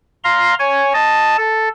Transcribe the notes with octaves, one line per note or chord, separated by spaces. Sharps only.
F5 A#5 C6
C#5 G#5
D#5 A5
A4